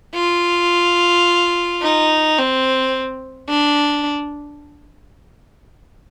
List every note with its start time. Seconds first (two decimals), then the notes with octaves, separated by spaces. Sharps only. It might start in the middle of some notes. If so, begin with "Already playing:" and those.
0.15 F4
1.83 D#4
2.39 C4
3.50 D4